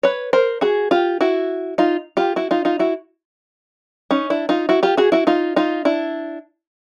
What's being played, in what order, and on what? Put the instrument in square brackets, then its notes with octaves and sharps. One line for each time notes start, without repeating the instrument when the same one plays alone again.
[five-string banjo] B4 C#5
A#4 C5
F#4 G#4
F4 G4
E4 F#4
D#4 F4
F4 G4
E4 F#4
D#4 F4
D#4 F4
E4 F#4
C#4 D#4
D4 E4
D#4 F4
E4 F#4
F4 G4
F#4 G#4
E4 F#4
D#4 F4
D#4 F4
D4 E4